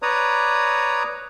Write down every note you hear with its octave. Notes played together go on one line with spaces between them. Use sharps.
B4 C#5 D5 A#5 D#6